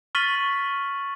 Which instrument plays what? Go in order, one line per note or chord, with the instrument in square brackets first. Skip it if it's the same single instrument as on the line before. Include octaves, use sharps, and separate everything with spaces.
[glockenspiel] C#6 F6 A6 B6 D#7 F#7